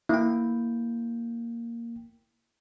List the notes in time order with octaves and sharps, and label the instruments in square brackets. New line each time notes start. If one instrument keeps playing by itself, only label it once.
[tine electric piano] A#3 G5 [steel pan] E4